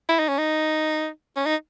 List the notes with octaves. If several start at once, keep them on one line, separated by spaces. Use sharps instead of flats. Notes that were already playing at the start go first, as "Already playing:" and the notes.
E4
D#4
C#4
D#4
C#4
D#4